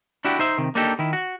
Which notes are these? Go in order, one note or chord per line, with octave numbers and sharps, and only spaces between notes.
D4 E4 F#4 G4
D#4 C5 E5
C3 D#3
A#3 D4 D#4 G4 A4
D#3 E4
F#4